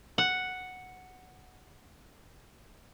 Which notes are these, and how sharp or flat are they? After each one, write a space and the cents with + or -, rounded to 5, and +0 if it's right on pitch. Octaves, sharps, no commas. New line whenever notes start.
F#5 +0